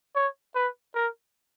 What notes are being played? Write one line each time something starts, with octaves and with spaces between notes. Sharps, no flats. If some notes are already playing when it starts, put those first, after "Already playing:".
C#5
B4
A#4